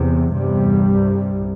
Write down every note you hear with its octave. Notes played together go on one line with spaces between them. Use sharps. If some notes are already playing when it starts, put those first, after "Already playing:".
Already playing: E2 C3
E2 G2 C3 G3
C2 C3